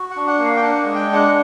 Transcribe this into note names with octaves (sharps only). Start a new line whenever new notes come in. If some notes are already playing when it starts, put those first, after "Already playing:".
Already playing: F#4
F#5
D4
F#5
A#3
F5
G5
D4 F#5
G#3
G5
D4
F#5